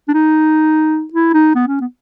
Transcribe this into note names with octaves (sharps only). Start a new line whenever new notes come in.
D4
D#4
E4
D#4
B3
C#4
B3